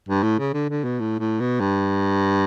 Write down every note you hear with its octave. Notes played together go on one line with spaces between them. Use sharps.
G2
A2
C#3
D3
D3
B2
A2
A2
B2
G2